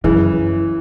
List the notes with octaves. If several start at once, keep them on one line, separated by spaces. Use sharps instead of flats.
F#2 C#3 E3